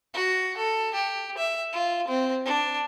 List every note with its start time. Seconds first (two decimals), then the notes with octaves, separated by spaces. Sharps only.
0.13 F#4
0.56 A4
0.94 G4
1.38 E5
1.73 F4
2.07 C4
2.45 D4